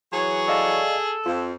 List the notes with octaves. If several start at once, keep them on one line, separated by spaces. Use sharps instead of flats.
E3 F#3 G#4 C#5
A4 D5 D#5 F5
F2 F4